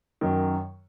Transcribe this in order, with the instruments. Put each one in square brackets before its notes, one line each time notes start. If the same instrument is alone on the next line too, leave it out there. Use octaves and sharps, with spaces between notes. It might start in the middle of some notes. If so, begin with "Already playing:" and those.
[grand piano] F#2 D#3 F#3